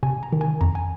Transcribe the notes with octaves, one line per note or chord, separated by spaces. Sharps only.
C3 G#5
A#5
D#3
G#5
F2 A#5
G#5